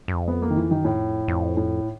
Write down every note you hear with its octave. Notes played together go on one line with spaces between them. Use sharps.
F#2
F2
B3
A#3
D#3
E3
F#2 D#3
F2 A2
F2
A2